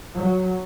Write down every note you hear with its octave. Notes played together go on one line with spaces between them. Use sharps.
F#3